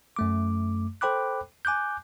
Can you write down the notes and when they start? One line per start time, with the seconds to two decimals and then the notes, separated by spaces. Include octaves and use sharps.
0.16 F#2 A3 D6
1.01 A4 C5 G5 B5 D6 F#6
1.65 G#5 D6 F#6 G6